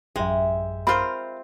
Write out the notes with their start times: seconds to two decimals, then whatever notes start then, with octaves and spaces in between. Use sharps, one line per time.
0.16 A1 F#2 G#3 E5 G5
0.87 C4 F4 A#4 F5 B5